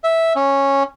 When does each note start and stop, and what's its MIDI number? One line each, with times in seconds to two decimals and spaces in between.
0.04 0.33 76
0.36 0.83 61